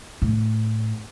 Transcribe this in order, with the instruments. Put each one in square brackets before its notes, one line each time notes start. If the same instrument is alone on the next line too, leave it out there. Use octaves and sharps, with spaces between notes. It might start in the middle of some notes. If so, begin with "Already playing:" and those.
[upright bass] A2